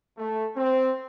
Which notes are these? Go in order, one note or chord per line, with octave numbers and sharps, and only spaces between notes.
A3
C4